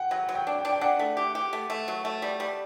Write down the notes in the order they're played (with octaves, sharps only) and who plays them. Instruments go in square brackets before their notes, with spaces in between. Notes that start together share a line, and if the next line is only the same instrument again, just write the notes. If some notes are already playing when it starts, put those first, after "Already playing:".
Already playing: [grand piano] F#5 G5
[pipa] F#3 [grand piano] F#5
[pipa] F#3
[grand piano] G5
[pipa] D4
[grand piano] G5
[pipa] D4
[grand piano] G5
[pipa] D4 [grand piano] F#5
[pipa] A3
G4
G4
A3
A3
F#3
A3
G3
G3